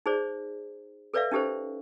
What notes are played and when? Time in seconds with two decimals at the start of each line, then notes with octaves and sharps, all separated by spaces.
0.06 D#4 G#4 C5 D5
1.14 A4 B4 C#5 D5 E5 F5
1.32 C#4 D#4 G4 A4 C5